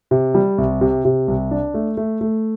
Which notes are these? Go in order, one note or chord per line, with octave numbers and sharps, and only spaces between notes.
C3
G3
C2
C3
C3
C2
D4
A3
A3
A3